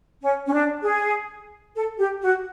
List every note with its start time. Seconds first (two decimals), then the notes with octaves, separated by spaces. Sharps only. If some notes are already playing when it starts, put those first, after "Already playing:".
0.22 C#4
0.47 C#4
0.53 D4
0.83 G#4
1.75 A4
1.98 G4
2.22 F#4